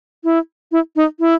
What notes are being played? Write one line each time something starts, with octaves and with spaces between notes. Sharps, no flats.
E4
E4
D#4
E4